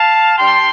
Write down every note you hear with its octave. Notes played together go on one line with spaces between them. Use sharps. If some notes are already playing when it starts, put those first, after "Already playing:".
Already playing: F5 A5
G3 D4 G4 G5 C6